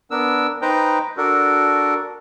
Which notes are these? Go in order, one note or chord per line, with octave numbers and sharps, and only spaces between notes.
B3 D4 A#4 E6
D#4 B4 C5 G5 A#5
D4 F#4 A4 A#4